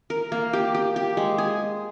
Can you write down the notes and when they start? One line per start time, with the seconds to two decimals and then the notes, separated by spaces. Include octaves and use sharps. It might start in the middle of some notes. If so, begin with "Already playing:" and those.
0.10 A#4
0.32 A#3
0.53 G4
0.74 G4
0.96 G4
1.17 G#3
1.38 G#4